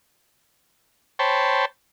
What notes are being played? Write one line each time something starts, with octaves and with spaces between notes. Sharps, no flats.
C5 C#5 G5 A5 B5